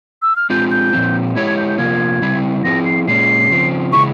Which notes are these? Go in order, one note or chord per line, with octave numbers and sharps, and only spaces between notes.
E6
F6
G#3 C4 F4 G6
G6
A#2 F3 C4
G#3 E4 G4 C#5 G#6
G#6
G6
G6
C3 F3 A#3 F4 G#6
C#3 G3 C4 E4
F3 C4 E4 G#4 A#6
C7
A#2 G#3 C#4 C7
C#3 F3 C4
C#3 E3 G#3 E4 C#6